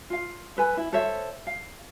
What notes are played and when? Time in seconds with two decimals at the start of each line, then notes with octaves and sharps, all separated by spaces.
0.10 F4 F5
0.57 A4 B4 G#5 B5
0.77 E4
0.93 A4 C5 C#5 E5
1.47 F5